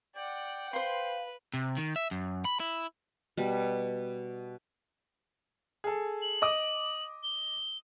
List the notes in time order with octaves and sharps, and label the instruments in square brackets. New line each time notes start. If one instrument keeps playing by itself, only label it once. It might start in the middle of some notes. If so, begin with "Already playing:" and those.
[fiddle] D5 F#5 [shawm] G5
[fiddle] B4 [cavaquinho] C5 C6 [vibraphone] F5
[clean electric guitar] C3
D#3
E5
F#2
B5
E4
[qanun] B2 G3
[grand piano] G#4 A4
[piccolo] F#7
[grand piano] D#5 D6 D#6
[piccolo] G7